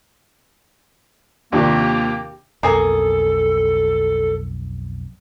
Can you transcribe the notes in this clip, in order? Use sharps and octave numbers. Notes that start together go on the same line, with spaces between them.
D#2 C3 D#3 F3 A#3 D4 G4
B1 F2 A#3 B3 G#4 A4